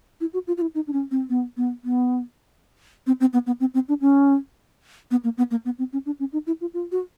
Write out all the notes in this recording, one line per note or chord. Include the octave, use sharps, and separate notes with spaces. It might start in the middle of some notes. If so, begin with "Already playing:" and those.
E4
F#4
F4
F4
E4
D#4
D4
C#4
C4
B3
B3
B3
C4
C4
B3
B3
C4
C4
D4
C#4
B3
A#3
B3
A#3
B3
C4
C#4
D4
C#4
D#4
E4
F4
F4
F#4